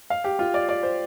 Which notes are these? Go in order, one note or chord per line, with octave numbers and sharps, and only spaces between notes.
F5
G4
F4
D5
D5
C5